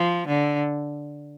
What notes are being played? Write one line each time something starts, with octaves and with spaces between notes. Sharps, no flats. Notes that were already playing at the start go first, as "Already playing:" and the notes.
Already playing: F3
D3